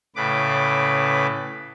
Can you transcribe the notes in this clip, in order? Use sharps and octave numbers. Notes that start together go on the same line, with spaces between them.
A2 C#3 B4 D6